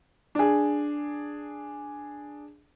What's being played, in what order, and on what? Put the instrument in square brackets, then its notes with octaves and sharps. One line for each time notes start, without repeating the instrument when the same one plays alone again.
[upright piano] D4 G#4